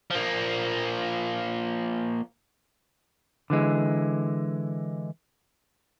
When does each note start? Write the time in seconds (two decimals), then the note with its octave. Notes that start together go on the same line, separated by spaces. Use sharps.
0.11 F3 A#3
3.50 D3 E3 G#3